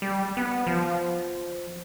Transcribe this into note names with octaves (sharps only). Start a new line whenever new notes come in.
G3
B3
F3